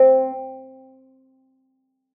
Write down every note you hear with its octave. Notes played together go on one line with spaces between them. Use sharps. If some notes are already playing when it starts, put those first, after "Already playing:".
Already playing: C4